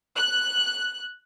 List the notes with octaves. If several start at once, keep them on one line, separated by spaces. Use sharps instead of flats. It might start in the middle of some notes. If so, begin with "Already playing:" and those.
F#6